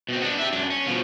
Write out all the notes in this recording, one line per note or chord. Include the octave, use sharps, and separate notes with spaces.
B2 C4
B3 D4
G4 E5
F#2 D4
C#4
B2 F3